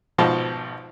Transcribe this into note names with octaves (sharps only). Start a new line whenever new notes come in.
G#1 B2 F3 A5